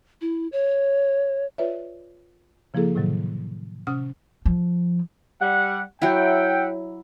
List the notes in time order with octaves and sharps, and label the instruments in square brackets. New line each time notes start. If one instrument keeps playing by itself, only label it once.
[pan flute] E4
C#5
[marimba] F4 B4 C#5 D5 E5
C#3 F3 A#3 E4 G#4 A4
A2 C3 D#3 F#3
C3 C#4 F#5 D#6 F6
[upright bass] F3
[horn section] G3 F#5
[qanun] F#3 E4 [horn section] E5 F#5 G5